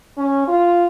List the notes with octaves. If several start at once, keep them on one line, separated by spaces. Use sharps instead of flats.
C#4
F4